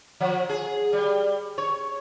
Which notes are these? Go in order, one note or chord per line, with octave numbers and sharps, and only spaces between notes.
F3
G#4
G3
C#5